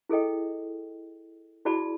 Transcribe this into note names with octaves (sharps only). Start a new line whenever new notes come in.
E4 G#4 A4 D#5 G5
E4 F#4 G#4 D5 A5 B5